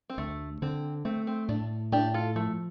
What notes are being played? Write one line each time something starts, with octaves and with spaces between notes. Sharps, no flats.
C4
D2 A3
D3 C4
A3 C4
C4
A2 D4
A2 D4 G4
F4 A4
F3 A3